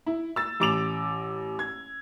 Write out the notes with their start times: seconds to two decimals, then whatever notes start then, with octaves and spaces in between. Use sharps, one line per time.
0.06 E4
0.36 E6 A6
0.60 A1 D6 F7
1.59 G#6